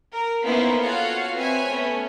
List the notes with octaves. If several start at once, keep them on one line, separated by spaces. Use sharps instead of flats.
A#4
A#3 B3 C#4 D#4 E4 C5
F4 F#4 A4 C#5 F5 F#5
C4 B4 C#5 E5 G#5
A3 B3 C#4